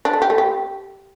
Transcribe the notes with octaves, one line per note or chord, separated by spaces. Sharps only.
D4
A3
G4
A3
G4